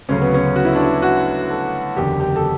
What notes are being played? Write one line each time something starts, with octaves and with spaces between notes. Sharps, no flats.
D2 C#3 F#3 C#4
B3
C#4
F#4
E4
D4
E4
F#4
A4
F#1 E2 D3 G4
G4
A4